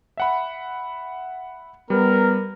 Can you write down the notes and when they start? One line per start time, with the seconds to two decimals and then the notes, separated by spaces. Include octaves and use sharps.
0.17 E5 F#5 B5
1.90 G3 B3 A#4